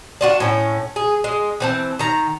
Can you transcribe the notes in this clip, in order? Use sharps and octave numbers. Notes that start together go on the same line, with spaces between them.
D4 F4 F#4
A2 C#4
G#4
G#3
E3 C4 A5
D#3 A#5